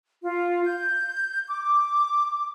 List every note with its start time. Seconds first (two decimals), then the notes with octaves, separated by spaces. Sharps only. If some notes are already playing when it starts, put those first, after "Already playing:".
0.22 F4
0.64 G6
1.47 D6